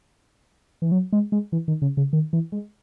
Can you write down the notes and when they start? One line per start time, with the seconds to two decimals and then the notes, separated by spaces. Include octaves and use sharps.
0.82 E3
0.92 F#3
1.13 G#3
1.32 G#3
1.52 E3
1.68 D#3
1.82 C#3
1.97 C#3
2.13 D#3
2.33 E3
2.52 G#3